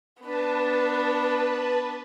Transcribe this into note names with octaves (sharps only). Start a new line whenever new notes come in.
B3 D4 B4 A5